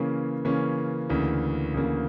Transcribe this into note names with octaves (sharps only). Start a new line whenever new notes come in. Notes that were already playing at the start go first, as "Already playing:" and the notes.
Already playing: C#3 E3 A#3 C#4
C#3 E3 A#3 C#4
D2 C#3 E3 A#3
D2 C#3 E3 A#3